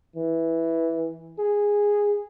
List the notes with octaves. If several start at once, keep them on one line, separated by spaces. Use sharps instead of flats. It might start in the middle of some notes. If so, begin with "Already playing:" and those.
E3
G#4